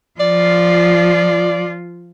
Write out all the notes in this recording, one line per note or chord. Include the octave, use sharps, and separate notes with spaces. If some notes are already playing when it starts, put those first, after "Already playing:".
F3 F4 D5